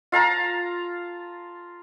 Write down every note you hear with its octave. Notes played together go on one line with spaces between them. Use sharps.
F4 F5 A5 A#5